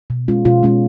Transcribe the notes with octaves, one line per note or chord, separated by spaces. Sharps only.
B2
G#3 C#4 F4
B2 F4
G#3 C#4 F4